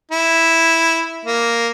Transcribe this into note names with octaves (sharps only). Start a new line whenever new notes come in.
E4
A#3